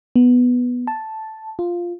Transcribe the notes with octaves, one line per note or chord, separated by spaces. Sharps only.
B3
A5
F4